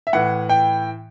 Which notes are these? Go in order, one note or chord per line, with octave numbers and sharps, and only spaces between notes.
E5
A2 E3 F#5
G5